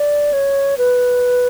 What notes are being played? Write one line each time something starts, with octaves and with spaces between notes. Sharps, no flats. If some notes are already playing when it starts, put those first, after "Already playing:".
Already playing: D5
C#5
B4